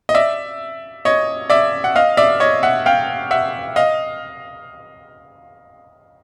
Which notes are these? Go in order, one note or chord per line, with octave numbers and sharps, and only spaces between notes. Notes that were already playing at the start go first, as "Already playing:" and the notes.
D#5
D5 E5
C#5 D#5
D5 E5
F#5
D#5 F5
D5 E5
C#5 D#5
E5 F#5
F5 G5
E5 F#5
D#5 F5